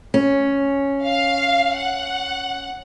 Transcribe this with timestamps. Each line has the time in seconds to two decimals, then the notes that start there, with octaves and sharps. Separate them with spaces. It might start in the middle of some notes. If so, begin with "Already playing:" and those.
0.14 C#4
1.04 F5
1.77 F#5